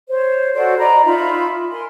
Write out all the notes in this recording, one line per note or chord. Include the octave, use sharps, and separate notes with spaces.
C5 C#5
F#4 A4 C5 D5
D5 D#5 A#5 B5
D#4 F4 E5 B5
A#4 G#5 C6